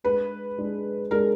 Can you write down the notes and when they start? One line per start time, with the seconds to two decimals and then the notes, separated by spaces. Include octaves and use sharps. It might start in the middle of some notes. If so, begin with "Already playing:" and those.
0.04 G#3 D4 G#4 B4
0.58 G#3 D4 G#4
1.11 G#3 D4 G#4 A#4